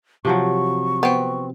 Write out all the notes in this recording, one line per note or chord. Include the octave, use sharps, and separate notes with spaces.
C3 F3 F#3 C#6
B3 C4